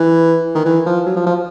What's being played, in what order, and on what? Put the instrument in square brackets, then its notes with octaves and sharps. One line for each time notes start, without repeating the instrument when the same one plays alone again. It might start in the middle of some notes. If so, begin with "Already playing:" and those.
Already playing: [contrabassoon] E3
D#3
E3
F3
F#3
F3
F3